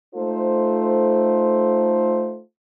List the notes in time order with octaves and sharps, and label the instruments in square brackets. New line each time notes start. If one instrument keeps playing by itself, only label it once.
[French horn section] A3 D#4 F4 A4 C5